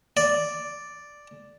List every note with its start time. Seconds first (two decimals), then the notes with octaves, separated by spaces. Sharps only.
0.17 D5